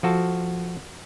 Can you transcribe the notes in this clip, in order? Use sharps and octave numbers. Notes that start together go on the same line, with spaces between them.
F3 F#4 A4 A5